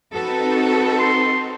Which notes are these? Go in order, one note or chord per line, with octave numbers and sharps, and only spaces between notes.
C4 D#4 F#4 A4 B4
C6